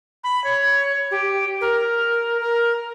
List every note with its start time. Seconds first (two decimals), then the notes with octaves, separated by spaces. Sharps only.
0.24 B5
0.44 C#5
1.11 G4
1.61 A#4
2.41 A#4